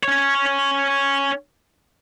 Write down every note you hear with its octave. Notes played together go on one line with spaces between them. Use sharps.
C#4 C#5